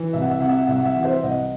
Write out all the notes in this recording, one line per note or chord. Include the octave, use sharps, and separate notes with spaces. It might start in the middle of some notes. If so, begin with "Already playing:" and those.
Already playing: E3
C2 E5
F#5
E5
C3 F#5
E5
F#5
C2 E5
F#5
E5
E3 F#5
C5 E5
C2 D#5 F#5